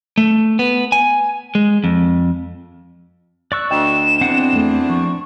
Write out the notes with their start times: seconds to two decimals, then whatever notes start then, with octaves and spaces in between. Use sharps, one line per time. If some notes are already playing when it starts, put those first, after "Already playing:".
0.18 A3
0.59 B3
0.92 G#5
1.55 G#3
1.84 F2
3.52 D5 C#6 E6 F#6
3.71 D2 D#5 G5 E7
4.21 E2 C4 D4 F#5
4.53 F2 A3
4.90 F3 C#6